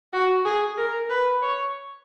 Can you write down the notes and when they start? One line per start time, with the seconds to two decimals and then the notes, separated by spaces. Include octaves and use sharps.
0.13 F#4
0.45 G#4
0.77 A#4
1.10 B4
1.42 C#5